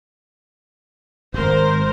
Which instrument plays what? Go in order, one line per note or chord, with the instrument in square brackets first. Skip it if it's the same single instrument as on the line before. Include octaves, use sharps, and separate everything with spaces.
[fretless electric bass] D1 G#1 [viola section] A#4 C5